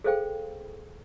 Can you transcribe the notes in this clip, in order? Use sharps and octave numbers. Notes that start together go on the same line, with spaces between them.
G#4 A4 C5 F5 G5